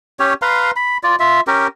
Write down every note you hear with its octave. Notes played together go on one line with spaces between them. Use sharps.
C#4 G4 C#5
B4 F5 A#5 C6
B5
F4 D5
F4 E5
C#4 G4 A#4